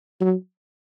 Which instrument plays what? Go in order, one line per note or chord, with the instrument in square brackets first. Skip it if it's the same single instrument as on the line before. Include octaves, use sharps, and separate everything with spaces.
[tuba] F#3